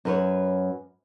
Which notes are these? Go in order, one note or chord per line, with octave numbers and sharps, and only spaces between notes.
F#2 B4 C#5